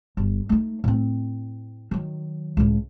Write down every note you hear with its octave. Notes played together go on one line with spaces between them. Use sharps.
G1
A3 D#4
A2 C4
D#3 F#3
C#2 A2